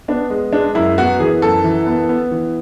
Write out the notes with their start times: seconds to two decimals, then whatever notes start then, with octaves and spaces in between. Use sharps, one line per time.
0.08 B3 D4
0.30 G#3
0.53 G#3 D4
0.75 F#2 E4
0.98 B3 F#4
1.20 E3 G#4
1.42 F#2 A4
1.64 E3
1.86 B3
2.09 B3
2.31 E3